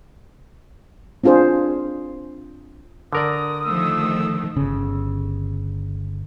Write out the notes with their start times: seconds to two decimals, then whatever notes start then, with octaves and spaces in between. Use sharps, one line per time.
1.24 C4 D4 F4 G#4 C5
3.13 D3 A#4 D5 D#6
3.66 D#3 F3 A3 E6
4.57 G1 C#3